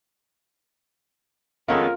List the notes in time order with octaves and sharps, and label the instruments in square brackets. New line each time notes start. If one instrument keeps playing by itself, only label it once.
[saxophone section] F2 G#3 C#4 [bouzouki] D#3 B3 A4 [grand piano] F4 [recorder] A#4